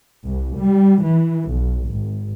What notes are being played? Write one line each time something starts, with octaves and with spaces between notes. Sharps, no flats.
C2
G3
E3
B1
G#1